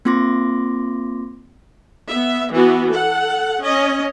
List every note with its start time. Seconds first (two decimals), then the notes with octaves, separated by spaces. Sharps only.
0.05 A#3 C4 F4 C6 D6 A#6
2.08 B3 E5
2.51 E3 B3 F#4
2.91 A4 F#5
3.61 C#4 D#5